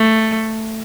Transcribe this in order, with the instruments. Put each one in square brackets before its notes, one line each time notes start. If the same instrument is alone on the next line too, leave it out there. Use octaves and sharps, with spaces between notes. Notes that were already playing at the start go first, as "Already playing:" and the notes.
Already playing: [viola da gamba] A3